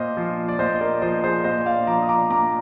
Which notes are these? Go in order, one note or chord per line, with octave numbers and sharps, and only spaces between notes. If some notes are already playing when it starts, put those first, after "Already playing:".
Already playing: A#2 C5 D#5
F3
D5
A#2 C5 D#5
D#5
A#4 D5
F3 C5 D#5
G#4 C5
A#2 C5 D#5
D5 F5
F3 A#5 D6
D#6
A#5 D6
A#2 A#5 D6